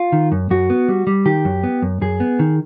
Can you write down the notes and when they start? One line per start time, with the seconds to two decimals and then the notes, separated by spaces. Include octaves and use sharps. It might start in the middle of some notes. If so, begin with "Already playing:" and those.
Already playing: F4
0.12 D#3
0.32 F#2
0.50 F#2 F#4
0.70 B3
0.88 G3
1.07 G3
1.26 D#3 G4
1.45 F#2
1.63 B3
1.82 F#2
2.01 F#2 G#4
2.20 B3
2.39 D#3